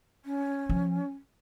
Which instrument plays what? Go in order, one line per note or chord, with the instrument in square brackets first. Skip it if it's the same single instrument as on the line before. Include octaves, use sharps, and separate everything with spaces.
[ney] C#4
[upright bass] F3